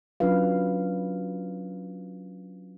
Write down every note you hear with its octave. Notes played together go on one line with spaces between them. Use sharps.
F#3 C#4 D4 F4 B4 F5